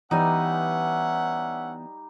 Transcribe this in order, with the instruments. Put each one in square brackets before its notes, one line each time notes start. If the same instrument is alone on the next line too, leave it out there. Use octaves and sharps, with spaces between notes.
[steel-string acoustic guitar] E3 B3 G#5 [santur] G3 D#4 [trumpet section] C#4 E5 F#5